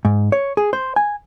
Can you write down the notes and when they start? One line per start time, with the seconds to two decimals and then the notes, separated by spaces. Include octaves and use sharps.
0.05 G#2
0.32 C#5
0.57 G#4
0.73 C5
0.96 G#5